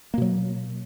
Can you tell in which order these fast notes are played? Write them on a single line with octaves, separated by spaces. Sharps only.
A#3 B2 F#3